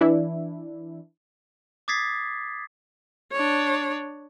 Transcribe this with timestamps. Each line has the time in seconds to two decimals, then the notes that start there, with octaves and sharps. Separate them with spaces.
0.01 E3 D4 E4
1.88 D6 D#6 G#6 A6 B6 C7
3.31 D4 C#5